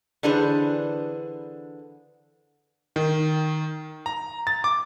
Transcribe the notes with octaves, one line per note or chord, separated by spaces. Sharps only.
D3 E3 D4 G#4 B4 C5
D#3
A#5
A6
D6